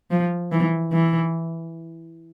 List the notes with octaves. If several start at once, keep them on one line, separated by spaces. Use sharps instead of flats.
F3
E3
E3